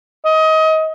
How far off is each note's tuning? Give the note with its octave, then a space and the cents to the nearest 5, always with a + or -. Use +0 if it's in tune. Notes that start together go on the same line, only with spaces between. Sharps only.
D#5 +25